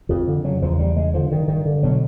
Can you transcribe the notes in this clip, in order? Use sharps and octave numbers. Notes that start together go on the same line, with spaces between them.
F2 F3
D3
C#3 F#3
E2 F3
E2 G3
C#3 G#3
D3 F3
G2 D#3
G2 D#3
D3
B2 F#3